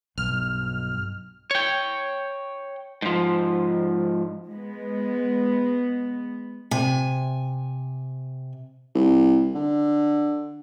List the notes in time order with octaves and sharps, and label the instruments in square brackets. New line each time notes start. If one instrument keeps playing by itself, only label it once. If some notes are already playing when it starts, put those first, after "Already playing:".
[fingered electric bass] B1 [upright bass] G2 [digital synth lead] F6
[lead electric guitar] C#5 G5
G#2 F3
[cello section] G#3 B3
[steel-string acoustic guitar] C3 G#5
[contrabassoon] C2
D3